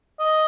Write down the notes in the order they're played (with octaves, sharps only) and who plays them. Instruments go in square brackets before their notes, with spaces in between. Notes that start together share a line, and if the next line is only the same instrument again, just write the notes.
[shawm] D#5